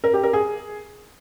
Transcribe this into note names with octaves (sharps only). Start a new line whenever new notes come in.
A#4
G4
A#4
G#4